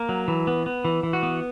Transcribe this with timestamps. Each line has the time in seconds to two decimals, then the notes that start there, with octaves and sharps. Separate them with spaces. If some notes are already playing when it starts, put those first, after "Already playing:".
Already playing: A#3 A#4
0.09 F#3
0.28 E3
0.47 B3
0.66 B3
0.85 E3
1.03 E3
1.13 F#4
1.23 B3